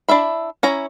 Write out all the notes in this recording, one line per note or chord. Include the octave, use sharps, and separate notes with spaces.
D4 E4 E5 B5
C#4 E4 A#5